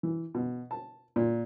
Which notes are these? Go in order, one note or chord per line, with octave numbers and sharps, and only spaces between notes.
E3
B2
A5
A#2